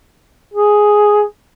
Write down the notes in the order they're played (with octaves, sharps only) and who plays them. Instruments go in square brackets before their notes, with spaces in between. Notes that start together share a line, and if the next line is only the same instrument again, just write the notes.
[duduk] G#4